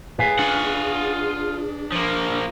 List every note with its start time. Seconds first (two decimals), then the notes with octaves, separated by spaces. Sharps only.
0.19 A2 G#4 B4 F5 G#5
0.39 D4 F4 F#5
1.92 F3 A#3